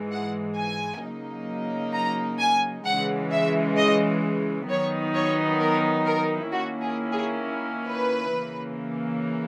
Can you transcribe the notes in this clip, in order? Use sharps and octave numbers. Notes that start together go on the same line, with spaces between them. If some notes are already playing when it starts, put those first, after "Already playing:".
Already playing: G#2 E3 G#3
F#5
G#5
C#3 F#3 A#3 D#4
A#5
G#5
C#3 E3 G#3 F#5
E5
D#5
D#3 F#3 B3 D#4 C#5
C#5
A#4
A#4
D#3 A#3 C#4 E4 F#4
G#4
G#4
B4
C#3 E3 A#3